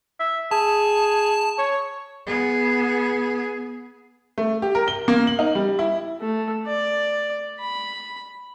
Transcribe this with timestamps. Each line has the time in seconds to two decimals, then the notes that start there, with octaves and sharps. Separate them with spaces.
0.20 E5
0.51 G#4 A5
1.58 C#5
2.26 B3 G#4
4.38 A3
4.62 G4
4.75 A#4
4.88 G7
5.08 A#3
5.27 F#7
5.39 D#4
5.55 G3
5.79 E4
6.21 A3
6.67 D5
7.60 B5